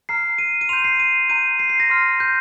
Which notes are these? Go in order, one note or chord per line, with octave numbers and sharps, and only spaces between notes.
A#5 F6 C7
D#7
D#7
C6 G6 F7
C7
D#7
A#5 G6 D#7
C7
C7
A#6
C6 F6
G6